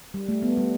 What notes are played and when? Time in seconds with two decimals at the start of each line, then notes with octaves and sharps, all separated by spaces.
0.14 G3
0.29 A3
0.43 B3
0.57 G3